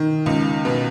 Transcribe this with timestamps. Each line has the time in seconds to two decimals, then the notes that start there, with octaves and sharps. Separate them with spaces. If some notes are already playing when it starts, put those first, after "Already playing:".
Already playing: D#3
0.26 C#2
0.65 B2